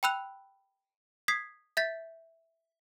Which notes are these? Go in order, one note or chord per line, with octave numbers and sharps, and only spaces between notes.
G5 A5 B5 E6 F#6 F7
D#6 G#6 B6 C7
E5 G6 A6 B6